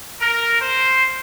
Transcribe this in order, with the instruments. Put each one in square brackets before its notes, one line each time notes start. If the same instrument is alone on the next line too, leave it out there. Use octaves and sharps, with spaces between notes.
[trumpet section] A#4
C5